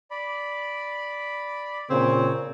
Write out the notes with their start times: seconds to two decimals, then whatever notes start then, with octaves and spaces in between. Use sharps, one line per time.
0.11 D5 B5
1.89 A#2 C#3 C4 C#5